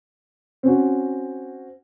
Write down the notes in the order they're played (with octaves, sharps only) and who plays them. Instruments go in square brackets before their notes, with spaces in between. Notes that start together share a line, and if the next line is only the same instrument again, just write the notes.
[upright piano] C4 C#4 F#4